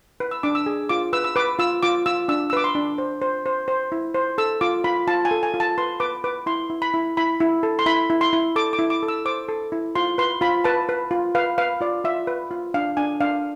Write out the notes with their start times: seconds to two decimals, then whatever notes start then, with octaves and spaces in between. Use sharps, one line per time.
0.20 B4
0.31 E6
0.43 D4 D6
0.55 E6
0.66 G#4
0.89 F4 D6
1.13 B4 E6
1.24 E6
1.36 B4 D6
1.59 F4 E6
1.83 F4 D6
2.06 F4 E6
2.28 D4 E6
2.50 E6
2.53 B4 D6
2.64 C6
2.75 D4
2.98 C5
3.22 C5
3.46 C5
3.68 C5
3.92 E4
4.14 C5
4.38 A4 E6
4.61 F4 D6
4.84 F4 B5
5.07 F4 A5
5.25 G#5
5.31 A4
5.43 G#5
5.54 F4
5.60 A5
5.78 B4 C6
6.00 B4 D6
6.24 B4 D6
6.46 E4 C6
6.70 E4
6.82 B5
6.94 E4
7.17 E4 B5
7.40 E4
7.63 A4
7.79 C6
7.86 E4 B5
8.10 E4
8.21 C6
8.33 E4
8.56 A4 D6
8.73 D6
8.79 E4
8.90 D6
9.03 A4
9.08 E6
9.25 C5 D6
9.48 A4
9.72 E4
9.95 F4 C6
10.18 B4 C6
10.41 F4 B5
10.64 B4 A5
10.89 B4
11.11 F4
11.35 B4 F5
11.58 B4 F5
11.81 F4 D5
12.04 F4 E5
12.27 B4
12.51 F4
12.74 D4 F5
12.97 D4 G#5
13.20 D4 F5